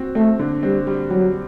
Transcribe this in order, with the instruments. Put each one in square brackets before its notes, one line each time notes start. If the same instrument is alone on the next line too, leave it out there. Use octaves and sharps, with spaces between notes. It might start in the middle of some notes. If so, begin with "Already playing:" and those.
Already playing: [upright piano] C4 F#4
[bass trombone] A3 [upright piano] C4
[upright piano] D3
[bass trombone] G3 [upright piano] C4
[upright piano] G3
[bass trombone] F#3 [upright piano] G3